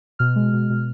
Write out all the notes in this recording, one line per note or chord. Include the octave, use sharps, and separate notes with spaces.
B2 F6
G#3
B2
B2